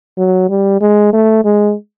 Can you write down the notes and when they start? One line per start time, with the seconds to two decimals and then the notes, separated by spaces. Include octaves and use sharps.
0.18 F#3
0.49 G3
0.81 G#3
1.13 A3
1.45 G#3